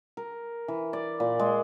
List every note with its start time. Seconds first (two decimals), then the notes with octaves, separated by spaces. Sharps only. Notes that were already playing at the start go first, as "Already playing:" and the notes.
0.17 A#4
0.68 E3
0.93 D5
1.20 A#2
1.39 G#3